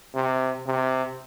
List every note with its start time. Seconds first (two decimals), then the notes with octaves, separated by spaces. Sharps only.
0.15 C3
0.66 C3